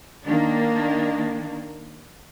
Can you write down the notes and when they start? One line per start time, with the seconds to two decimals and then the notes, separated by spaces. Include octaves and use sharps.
0.25 D#3 A#3 D4